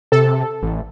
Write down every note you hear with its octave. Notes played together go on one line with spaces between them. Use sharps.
C3 A4
A1